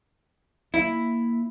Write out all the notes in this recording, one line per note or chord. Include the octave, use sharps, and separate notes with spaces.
A#3 E4